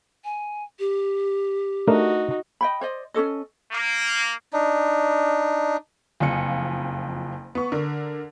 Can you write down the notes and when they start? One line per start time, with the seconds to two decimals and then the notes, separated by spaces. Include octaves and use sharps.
0.24 G#5
0.79 G4
1.88 A3 D4 D#4 F#4 A#4
2.61 D#5 G5 B5
2.81 C5 D5 D#5
3.14 C#4 F#4 A4 D#5
3.72 A#3
4.53 D4 D#4
6.20 F#1 F2 F4 G#5 C#7
7.55 B3 C#6
7.72 D3 A#4